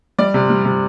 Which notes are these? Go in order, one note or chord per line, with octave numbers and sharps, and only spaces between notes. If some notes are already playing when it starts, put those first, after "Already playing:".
G3 D5
C3
G3
C3